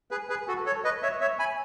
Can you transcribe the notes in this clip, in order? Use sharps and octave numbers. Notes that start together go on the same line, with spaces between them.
G#4 B4
G#4 B4
F#4 A4
A4 C#5
B4 D#5
C#5 E5
C#5 E5
G#5 B5